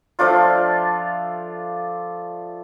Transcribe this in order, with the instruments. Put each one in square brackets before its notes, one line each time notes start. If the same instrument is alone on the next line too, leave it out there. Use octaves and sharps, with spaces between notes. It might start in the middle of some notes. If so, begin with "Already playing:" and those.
[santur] F3 A3 D4 F4